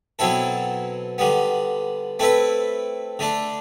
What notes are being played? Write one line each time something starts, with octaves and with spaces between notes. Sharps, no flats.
B2 F#3 C4 E4 A4
D3 G3 B3
A3 C4 E4 B4 E5
D3 A3 D4